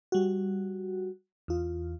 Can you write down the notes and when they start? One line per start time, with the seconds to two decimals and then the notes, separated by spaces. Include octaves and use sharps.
0.12 G3 F#4
1.48 E2 F4